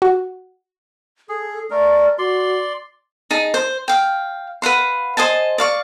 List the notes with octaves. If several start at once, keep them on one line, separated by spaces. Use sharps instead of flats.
F#4
G#4 A4
A3 A#4 D5
F#4 D5 C6
D#4 G#4 A5
C5
F5 G5
B4 F5 F#5 C6
C5 D#5 G#5 A5
D5 F5 C#6